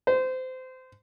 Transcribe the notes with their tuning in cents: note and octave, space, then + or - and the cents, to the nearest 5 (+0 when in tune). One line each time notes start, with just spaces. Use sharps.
C5 -25